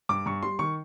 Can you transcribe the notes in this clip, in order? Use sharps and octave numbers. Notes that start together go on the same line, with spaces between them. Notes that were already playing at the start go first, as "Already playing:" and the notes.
G2 D6
G2 C#6
G3 C6
D#3 C#6